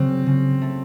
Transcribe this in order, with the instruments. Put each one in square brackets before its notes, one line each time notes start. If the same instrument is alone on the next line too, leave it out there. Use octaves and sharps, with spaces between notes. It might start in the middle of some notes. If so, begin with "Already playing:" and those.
Already playing: [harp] C#3 F#3 [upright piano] C4
[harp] C#3
A3